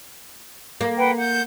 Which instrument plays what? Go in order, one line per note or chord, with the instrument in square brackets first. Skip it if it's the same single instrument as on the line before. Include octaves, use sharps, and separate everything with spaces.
[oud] A#3
[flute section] B4 F#5 G5
F#5 G6